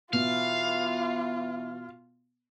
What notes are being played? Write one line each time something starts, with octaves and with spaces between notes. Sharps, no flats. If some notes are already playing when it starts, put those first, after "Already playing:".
B2 E3 F4 F5